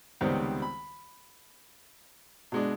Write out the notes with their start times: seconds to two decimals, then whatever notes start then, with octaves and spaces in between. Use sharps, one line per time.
0.21 C#2 C3 D#3 G3 B3 C4
0.62 B5
2.52 B2 G#3 D4